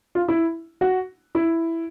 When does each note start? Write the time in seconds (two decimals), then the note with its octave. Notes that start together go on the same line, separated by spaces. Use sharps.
0.15 F4
0.28 E4
0.81 F#4
1.35 E4